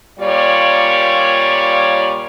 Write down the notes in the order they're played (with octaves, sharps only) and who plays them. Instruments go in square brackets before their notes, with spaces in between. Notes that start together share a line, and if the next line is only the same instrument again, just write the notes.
[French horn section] A#2 G3 F4 C#5 D5